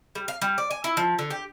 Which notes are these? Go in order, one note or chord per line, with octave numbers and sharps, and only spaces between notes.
G3
F5
G3
D5
G#5
E4
F3
D3
G4